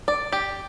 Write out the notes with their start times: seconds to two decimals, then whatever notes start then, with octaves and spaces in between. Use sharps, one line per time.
0.08 D5
0.32 G4